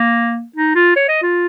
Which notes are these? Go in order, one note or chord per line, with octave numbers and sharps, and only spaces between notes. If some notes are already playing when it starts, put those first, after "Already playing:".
Already playing: A#3
D#4
F4
C#5
D#5
F4